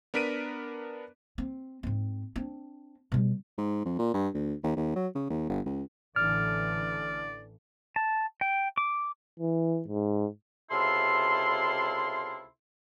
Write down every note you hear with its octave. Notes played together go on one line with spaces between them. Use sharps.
B3 D4 A#4 B6 D7 D#7
C4
G#2 C4
C4 D4
B2 G3
G#2
F2
A#2
G2
D2
D#2
D#2
F#3
C#3
D#2
G1
C#2
A1 D3 E3 D5 F6
A5
G5
D6
E3
G#2
C#2 C3 E4 F4 A4 C6